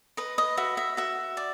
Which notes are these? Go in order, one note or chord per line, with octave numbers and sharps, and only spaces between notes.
B4 D#5
D#5
F#4 E5
E5
F#4 E5
D5